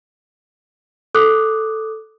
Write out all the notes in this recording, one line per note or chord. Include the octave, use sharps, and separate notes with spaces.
A4 D6 D#6 F#6